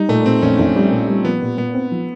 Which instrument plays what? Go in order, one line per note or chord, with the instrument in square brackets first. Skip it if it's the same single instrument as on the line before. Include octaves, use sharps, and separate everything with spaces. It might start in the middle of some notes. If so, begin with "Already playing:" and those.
Already playing: [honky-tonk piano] G3 [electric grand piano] D#4
[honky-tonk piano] A#2 [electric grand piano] A3
[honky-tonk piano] A#2 [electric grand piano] C4
[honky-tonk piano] A#1 [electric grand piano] C#4
[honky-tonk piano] A#1
G3
A#2
G3
[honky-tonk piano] F3 [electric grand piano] B3
[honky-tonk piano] A#2
[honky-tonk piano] A#2 [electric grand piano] B3
[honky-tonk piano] C4
F3